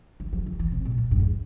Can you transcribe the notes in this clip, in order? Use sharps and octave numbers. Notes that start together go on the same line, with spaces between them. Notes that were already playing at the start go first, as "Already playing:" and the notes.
E3
F3
E3
E3
C3
A#2
A#2
G2
E2